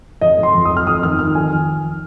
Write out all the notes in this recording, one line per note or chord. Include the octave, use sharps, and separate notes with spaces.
F2 D#5
F2 C6
F2
D#6
F2
F6
F2 D#6
D#3 F6
D#3 F6
F2 G#5